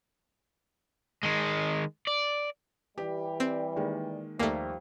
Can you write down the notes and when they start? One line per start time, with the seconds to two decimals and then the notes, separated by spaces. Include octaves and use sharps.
1.23 D#3 G#3
2.07 D5
2.98 E3 G3 G4
3.40 C4
3.76 D#3 G#3 A#3
4.39 D#2 F3 G3 A3 A#3 A#5